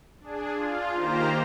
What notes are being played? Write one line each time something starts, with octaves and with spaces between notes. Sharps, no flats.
D4 G#4
F4
D#3 A#3 G4 C5 A#5